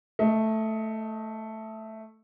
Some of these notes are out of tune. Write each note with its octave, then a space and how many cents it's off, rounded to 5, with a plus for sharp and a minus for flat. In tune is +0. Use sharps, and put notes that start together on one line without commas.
A3 +0 D#5 +30